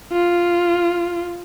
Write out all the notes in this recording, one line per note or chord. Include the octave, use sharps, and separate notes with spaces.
F4